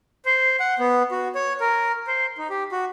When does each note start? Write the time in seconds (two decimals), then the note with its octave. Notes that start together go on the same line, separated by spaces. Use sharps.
0.25 C5
0.60 F#5
0.79 B3
1.11 F#4
1.35 C#5
1.60 A#4
2.07 C5
2.38 D#4
2.50 G4
2.72 F#4